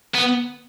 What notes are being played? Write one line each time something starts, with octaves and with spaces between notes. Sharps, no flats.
B3